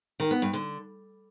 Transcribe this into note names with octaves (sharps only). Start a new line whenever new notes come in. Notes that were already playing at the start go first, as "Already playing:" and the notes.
D#3
B3
G2
D3